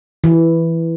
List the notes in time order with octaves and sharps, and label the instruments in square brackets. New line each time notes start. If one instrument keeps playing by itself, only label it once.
[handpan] E3